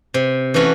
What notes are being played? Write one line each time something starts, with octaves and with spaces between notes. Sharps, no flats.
C3
E3 A3 C#4 F#4